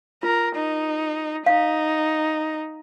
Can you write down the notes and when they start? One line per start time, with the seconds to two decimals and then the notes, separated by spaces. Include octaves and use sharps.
0.23 F4 A#4
0.55 D#4
1.46 D#4 F5